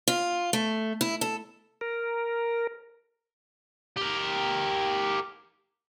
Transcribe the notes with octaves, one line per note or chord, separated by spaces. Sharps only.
F4
A3
E4
A4
A#4
G4 A#4